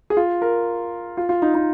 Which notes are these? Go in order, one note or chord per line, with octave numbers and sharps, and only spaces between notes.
G#4
F4
A#4
F4
F4
D#4
D#4